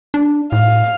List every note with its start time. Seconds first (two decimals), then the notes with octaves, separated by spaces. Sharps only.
0.14 D4
0.52 A2 F5